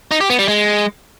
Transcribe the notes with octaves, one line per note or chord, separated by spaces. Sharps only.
D#4
G4
B3
G3
G#3